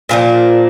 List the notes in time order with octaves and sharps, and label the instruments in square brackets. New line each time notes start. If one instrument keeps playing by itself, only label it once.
[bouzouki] A#2 F3 A#3 D4